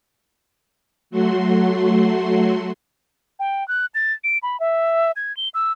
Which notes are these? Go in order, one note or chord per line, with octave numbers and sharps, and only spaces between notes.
F#3 A3 F#4 C6
G5
F#6
A6
D7
B5
E5
G#6
G7
E6